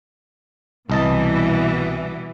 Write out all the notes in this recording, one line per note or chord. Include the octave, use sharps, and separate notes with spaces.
C2 B2 E3 G3 D#5 A5